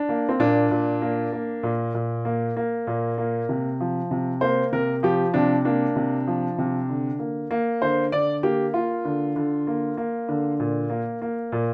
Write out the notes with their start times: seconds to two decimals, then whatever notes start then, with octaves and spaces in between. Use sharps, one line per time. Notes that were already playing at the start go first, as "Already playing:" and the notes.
Already playing: D4
0.09 A#3
0.29 C4
0.39 A#2 D4
0.71 A#2
1.02 A#3
1.32 A#3
1.63 A#2
1.94 A#2
2.25 A#3
2.57 A#3
2.87 A#2
3.18 A#3
3.49 C3
3.80 F3
4.11 C3
4.41 A#3 C5
4.72 C3 A#4
5.03 F3 G4
5.34 C3 D4
5.65 A#3 D4
5.96 C3
6.27 F3
6.58 C3
6.89 D3
7.19 A#3
7.51 A#3
7.82 D3 C5
8.12 D3 D5
8.43 A#3 G4
8.74 A#3 F4
9.05 D3
9.36 D3
9.67 A#3
9.97 A#3
10.29 D3
10.60 A#2
10.90 A#3
11.22 A#3
11.52 A#2